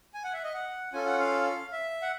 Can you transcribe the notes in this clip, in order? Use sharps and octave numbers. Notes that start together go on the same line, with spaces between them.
G#5
F#5
E5
D#5
F#5
C#4 F4 A4 G#5
F#5
F5
E5
F#5